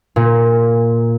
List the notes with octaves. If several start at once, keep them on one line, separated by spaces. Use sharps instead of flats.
A#2